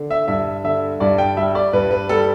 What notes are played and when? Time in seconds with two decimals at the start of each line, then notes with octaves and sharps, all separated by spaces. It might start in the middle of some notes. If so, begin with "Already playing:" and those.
Already playing: D3
0.11 E5
0.28 G2 E5
0.64 D3 E5
1.00 G2 D5
1.18 G5
1.37 G3 E5
1.55 D5
1.73 G2 B4
1.91 B4
2.09 G3 A4